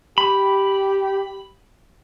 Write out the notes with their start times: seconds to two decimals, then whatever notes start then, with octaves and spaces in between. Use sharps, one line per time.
0.18 G4 B5